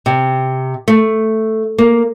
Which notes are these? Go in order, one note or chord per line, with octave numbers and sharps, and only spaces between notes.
C3
A3
A#3